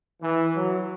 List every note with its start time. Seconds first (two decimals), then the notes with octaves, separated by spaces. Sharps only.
0.22 E3
0.54 F#3